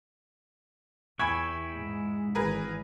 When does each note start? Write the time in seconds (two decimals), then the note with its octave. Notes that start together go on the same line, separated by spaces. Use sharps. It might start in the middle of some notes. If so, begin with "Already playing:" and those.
1.19 E2 E4 G5 G#5 B5 C#6 G#6
1.74 G#2 G#3
2.35 G#1 E3 G#4 A#4 B4